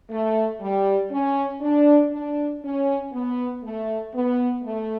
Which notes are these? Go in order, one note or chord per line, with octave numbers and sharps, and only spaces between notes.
A3
G3
C#4
D4
D4
C#4
B3
A3
B3
A3